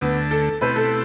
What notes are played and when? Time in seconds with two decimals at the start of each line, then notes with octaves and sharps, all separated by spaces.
0.01 D2 D3 A3 B3
0.31 A4
0.61 B2 A3 C4 E4 G4 B4
0.76 A4